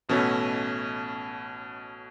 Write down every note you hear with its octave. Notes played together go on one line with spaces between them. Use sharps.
A1 B2 A3 C#4 B4